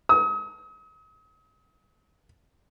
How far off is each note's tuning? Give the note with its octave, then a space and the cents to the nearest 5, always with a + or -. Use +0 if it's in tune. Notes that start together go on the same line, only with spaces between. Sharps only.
D#6 +40